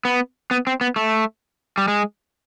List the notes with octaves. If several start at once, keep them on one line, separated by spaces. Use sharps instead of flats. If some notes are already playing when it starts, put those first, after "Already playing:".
B3
B3
C4
B3
A3
G3
G#3